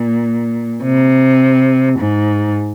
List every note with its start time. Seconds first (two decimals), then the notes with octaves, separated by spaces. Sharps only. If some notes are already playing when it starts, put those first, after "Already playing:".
Already playing: A#2
0.84 C3
2.00 G#2